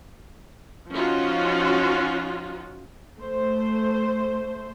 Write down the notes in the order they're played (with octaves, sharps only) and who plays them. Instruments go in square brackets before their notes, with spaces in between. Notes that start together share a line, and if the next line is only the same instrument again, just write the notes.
[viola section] F3 C#4 D#4 F4 F#4
A3 C5